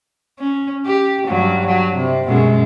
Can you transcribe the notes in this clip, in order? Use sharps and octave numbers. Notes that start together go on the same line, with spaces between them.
C#4
G4
G2 F#3
F#3
C3
F#2 B2 G#3